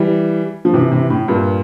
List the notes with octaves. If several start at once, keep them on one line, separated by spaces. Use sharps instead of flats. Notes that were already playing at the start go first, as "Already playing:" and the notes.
Already playing: E3 G3
F3
C3 E3
C3 E3
A2
G2 A#2